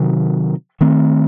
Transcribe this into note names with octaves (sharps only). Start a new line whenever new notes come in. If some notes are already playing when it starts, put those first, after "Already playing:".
Already playing: C3 D#3 F#3
D#3 A3 C4